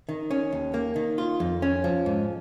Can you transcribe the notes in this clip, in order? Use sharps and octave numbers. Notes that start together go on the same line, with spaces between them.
D#3
C#4
D#2
A#3
D#3
F4
F2
C#4
F3
G#2